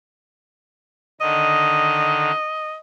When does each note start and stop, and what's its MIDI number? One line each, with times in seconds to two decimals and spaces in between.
1.21 2.31 50
1.21 2.31 51
1.21 2.76 75